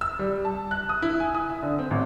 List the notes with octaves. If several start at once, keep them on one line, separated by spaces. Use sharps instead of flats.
E6
G3
A5
F#6
D#6
E4
G#5
D#6
E5
D3
C4
A1